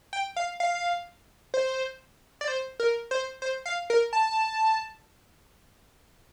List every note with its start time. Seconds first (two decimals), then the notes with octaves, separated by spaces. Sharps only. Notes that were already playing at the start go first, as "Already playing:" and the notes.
0.13 G5
0.36 F5
0.60 F5
1.54 C5
2.41 D5
2.48 C5
2.80 A#4
3.11 C5
3.42 C5
3.66 F5
3.90 A#4
4.13 A5